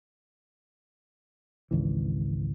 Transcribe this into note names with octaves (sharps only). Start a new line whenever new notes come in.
G#1 C#2 E3